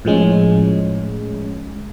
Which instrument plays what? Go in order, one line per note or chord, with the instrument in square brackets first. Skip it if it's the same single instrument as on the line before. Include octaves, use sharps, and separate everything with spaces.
[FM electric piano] A2 F3 G#3 C#4